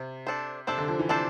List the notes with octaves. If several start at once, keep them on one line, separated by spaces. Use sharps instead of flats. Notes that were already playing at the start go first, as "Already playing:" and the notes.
Already playing: C3
D4 A4 C5
C3 D4 A4 C5
D3
F3
E3
C3 D4 A4 C5